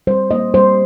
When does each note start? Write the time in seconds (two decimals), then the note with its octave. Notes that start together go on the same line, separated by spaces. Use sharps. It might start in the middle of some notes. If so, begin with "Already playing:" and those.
0.07 G3 C5
0.31 A#3 D#5
0.54 G3 C5